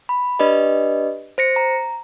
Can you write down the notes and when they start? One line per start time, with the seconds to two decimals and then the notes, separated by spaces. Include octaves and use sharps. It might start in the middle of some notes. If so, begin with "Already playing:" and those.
0.09 B5
0.39 D4 G4 B4 D5 D#5
1.38 C5 A#6 C#7
1.56 A#5